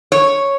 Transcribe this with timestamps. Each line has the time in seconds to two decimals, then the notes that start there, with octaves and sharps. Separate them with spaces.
0.12 C#5